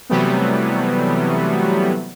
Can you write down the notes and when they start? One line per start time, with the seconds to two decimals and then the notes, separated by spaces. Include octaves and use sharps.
0.10 C3 E3 F#3 G3 A3 B3